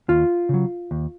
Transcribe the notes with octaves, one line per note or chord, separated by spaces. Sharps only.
D#2 F4
C#3 F#3
D#2